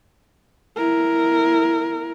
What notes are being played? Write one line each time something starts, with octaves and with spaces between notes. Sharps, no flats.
E4 A#4